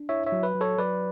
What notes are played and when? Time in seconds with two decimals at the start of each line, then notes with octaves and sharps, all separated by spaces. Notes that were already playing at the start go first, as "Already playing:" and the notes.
Already playing: D4
0.09 E4 C#5 E5
0.26 C#5 E5
0.32 F#3
0.43 B4
0.55 F#3
0.61 A4 C#5
0.78 F#3 B4 D5